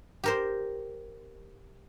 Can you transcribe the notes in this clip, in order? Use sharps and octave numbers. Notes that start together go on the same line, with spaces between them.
G4 A#4 C5